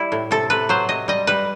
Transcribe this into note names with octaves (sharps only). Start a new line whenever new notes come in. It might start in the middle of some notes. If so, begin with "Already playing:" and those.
Already playing: G3 E4
A2
C3 A4
C3 B4
F#3 C5
C3 D#5
G3 D#5
G3 B4